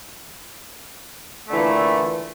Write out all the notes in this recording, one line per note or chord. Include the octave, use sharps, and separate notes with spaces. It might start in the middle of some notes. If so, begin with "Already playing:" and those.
A#2 D3 E3 A3